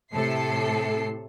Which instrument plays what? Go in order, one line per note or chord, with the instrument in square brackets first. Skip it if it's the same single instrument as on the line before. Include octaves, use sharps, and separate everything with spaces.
[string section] A2 C3 A4 C7